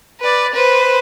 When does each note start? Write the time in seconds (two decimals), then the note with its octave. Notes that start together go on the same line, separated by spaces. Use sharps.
0.20 B4 D5
0.54 B4 C5